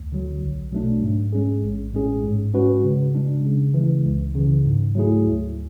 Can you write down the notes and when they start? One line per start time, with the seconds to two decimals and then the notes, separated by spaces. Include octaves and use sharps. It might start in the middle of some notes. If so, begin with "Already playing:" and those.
Already playing: D2
0.12 D3 F#3
0.42 B1
0.72 B2 F#3 A3 D4
1.02 G#2
1.33 G#3 C#4 G#4
1.63 A1
1.93 A2 G#3 C#4 G#4
2.23 G#2
2.54 G#3 C#4 F#4 B4
2.84 C#3
3.15 G#3 D4
3.45 C#3
3.74 E3 G#3
4.05 C#2
4.35 C#3 E3
4.65 G#2
4.95 F#3 A3 E4 G#4
5.25 D2